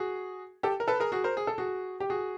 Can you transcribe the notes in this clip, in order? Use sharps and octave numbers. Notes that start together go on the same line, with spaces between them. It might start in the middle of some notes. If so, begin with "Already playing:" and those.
Already playing: F#4 G#4
G4 A4
A#4
A4 B4
G#4 A#4
F#4 G#4
A#4 C5
G#4
A4
F#4 G#4
G4
F#4 G#4